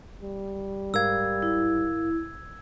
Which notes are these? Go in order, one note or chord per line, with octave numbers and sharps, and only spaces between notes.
G3
G#2 A#4 F5 E6 G#6
E4